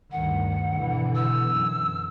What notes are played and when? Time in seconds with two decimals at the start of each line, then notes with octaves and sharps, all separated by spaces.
0.12 D2 G2 D#3 F#5
0.75 B2 D3 E3
1.15 E6
1.52 F#2